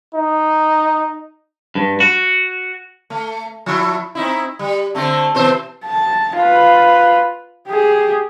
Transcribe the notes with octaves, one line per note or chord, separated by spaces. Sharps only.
D#4
G2
F#4
A3
F3 E4
C4 D#4 E4
G3
D3 A3 C4
B2 E3 C5
A5
F4 B4
G4 G#4